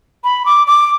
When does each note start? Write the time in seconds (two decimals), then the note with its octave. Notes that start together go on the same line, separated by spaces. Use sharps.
0.24 B5
0.46 D6
0.67 D6